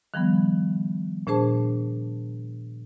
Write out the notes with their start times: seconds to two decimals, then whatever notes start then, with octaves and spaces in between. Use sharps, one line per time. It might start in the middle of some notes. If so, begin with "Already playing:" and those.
0.14 D#3 F3 G3 B3
1.27 A#2 D4 G#4 C5 A5